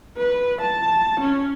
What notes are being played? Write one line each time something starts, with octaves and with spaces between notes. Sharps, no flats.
B4
A5
C#4